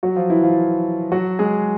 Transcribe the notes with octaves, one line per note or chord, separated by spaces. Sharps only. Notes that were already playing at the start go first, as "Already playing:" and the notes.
F#3 F#4
F3 F4
E3 E4
F3 F4
F#3 F#4
G#3 G#4